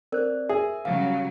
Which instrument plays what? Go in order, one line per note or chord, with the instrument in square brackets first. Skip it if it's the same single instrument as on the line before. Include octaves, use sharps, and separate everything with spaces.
[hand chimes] C4 D5 [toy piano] A#4 C5
[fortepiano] G#4 [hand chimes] E5
[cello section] C#3 F#3 G3 [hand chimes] F5